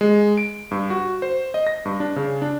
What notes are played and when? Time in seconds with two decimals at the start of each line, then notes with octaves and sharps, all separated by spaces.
0.01 G#3
0.37 D7
0.71 G2
0.90 F#4
1.22 C5
1.54 D#5
1.67 A#6
1.85 G2
2.00 D4
2.16 C#3
2.42 D4